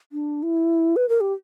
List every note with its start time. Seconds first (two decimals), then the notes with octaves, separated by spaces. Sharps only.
0.12 D4
0.43 E4
0.96 B4
1.09 A#4
1.21 G4